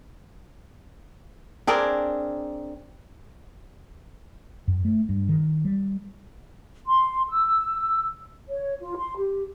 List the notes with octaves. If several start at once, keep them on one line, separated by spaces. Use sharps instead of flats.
C4 D4 G#4 A#4
F#2
A3
G2
D#3
G3
C6
E6
C#5
F4
C6
G4